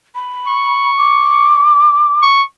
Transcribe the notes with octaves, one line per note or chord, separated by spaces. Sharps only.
B5
C#6
D6
C#6